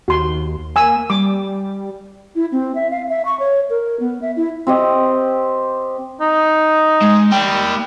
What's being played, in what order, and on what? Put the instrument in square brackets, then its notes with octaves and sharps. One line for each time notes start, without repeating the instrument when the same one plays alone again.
[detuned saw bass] D#2 [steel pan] F#4 C6
[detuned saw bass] A#3 [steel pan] G#5 E6
[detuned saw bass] G3 [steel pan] D6
[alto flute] E4
C4
E5
F5
E5
C#6
C#5
A#4
B3
E5
E4
[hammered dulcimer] C4 G4 D#5
[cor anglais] D#4
[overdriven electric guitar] G#3
[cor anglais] G3 [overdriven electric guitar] A#3 G5